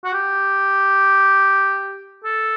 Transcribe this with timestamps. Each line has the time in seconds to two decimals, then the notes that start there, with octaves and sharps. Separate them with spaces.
0.05 F#4
0.14 G4
2.25 A4